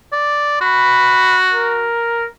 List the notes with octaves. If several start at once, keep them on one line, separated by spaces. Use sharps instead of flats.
D5
F#4 B5
A#4